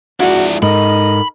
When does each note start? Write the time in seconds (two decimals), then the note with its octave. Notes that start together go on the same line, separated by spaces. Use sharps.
0.20 F3 G#3 D4 E4 F#4 D5
0.63 G#2 D#4 A4 A#4 D#5 B5